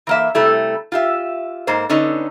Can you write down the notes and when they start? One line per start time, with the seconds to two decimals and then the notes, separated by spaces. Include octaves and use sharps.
0.07 E3 A#3 E5
0.35 C3 G3 A3 E4
0.92 F4 G4 E5
1.67 G#2 A#3 C5
1.89 D3 B3 C#4 D#4